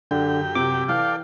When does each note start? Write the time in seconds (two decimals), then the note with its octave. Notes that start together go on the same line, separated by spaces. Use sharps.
0.11 F#2 D3 G4 G5
0.55 C3 D6
0.89 E3 A4 D5 F5 G5